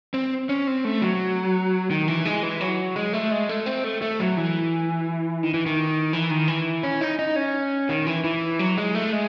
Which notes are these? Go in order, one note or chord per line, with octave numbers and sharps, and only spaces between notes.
C4
C#4
C4
A3
F#3
D#3
E3
G#3
E3
F#3
G#3
A3
G#3
A3
C4
A3
A3
F#3
E3
D#3
E3
D#3
E3
D#3
E3
C#4
D#4
D#4
C#4
D#3
E3
E3
F#3
G#3
A3
G#3